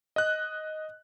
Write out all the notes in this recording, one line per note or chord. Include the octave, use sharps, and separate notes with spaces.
D#5 F#6